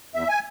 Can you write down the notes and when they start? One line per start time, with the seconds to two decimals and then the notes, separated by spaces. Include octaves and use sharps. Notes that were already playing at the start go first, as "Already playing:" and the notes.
0.14 E2 E5
0.29 G#5